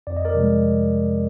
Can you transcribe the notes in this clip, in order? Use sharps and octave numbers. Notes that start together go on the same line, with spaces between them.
F2 D5
D#5
A#4 D5
C3 F3 G#3